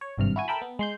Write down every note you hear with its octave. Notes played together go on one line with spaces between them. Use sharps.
C#5
G#1 G2 C3 F6
E4 F#4 G#5
A4 A#4 E5 G5 A5 B5
B3
G#3 C6 G6